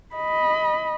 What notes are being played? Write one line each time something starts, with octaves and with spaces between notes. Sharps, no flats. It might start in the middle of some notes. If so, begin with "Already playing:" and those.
D#5 B5